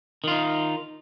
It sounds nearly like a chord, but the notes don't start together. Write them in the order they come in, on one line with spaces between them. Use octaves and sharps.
D#3 F4 D#4